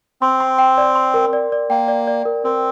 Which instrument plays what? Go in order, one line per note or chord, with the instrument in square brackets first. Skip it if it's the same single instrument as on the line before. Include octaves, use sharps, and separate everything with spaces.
[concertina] C4 [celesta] C6
[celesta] C6
G5
D5
C6
A#4
D5
D5
[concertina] A#3 [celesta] G5
[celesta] D5
D5
A#4
[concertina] C4 [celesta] A#4